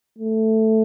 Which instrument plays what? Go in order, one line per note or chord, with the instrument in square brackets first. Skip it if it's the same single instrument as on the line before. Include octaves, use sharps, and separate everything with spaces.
[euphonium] A3